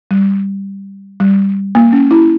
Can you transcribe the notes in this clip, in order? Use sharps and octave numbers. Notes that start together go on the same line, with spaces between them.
G3
G3
A#3
C#4
E4